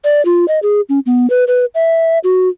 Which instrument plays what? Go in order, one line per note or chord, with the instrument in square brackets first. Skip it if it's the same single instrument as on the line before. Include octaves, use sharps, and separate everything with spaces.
[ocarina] D5
F4
D#5
G#4
C#4
B3
B4
B4
E5
F#4